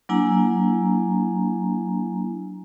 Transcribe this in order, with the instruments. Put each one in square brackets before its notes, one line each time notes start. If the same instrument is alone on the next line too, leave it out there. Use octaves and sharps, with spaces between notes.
[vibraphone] F#3 A#3 D4 E4 G#5 A#5